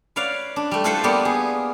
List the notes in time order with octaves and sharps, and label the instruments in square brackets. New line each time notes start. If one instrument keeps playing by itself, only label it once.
[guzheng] B4 C#5 D5 F5 F#5
D4
G3 A3
E4 F4 A4 B4 C5 F#5
G3 A#3 B3 G4
G#4